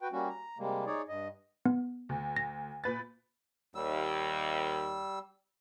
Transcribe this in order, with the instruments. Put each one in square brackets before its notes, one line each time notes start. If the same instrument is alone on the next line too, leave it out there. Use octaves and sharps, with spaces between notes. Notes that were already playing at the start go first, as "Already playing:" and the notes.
[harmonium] F#4 B4 G5
G3 A#3 C#4 F#4
A#5
C3 G3 G#3 A#3
D#4 G#4 C#5 D5
G2 D#5
[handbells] B3
[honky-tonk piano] D2
[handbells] A#6
[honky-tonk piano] A#2 B4 A6
[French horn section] D#2 [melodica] G3 E6